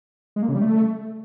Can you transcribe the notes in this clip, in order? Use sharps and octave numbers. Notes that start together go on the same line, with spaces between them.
G#3
A#3
C#3
G3
A3